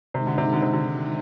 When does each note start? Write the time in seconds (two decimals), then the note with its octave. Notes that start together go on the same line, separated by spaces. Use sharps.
0.14 C3 D#3 G#3 D#4
0.27 D3
0.38 C3
0.53 D3
0.62 C3
0.73 D3